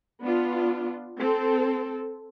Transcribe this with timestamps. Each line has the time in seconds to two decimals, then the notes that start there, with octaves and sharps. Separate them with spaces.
0.21 B3 D4 F4
1.19 C4 A4